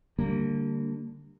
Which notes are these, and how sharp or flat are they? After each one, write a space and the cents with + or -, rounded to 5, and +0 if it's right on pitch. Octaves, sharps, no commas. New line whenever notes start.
D3 +0 G3 +0 A#3 -25